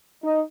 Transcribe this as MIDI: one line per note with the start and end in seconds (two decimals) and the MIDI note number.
0.23 0.41 63